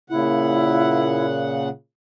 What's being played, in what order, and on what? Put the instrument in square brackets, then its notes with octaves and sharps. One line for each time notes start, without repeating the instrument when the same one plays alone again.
[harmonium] A#2 C#3 F#5 [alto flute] E4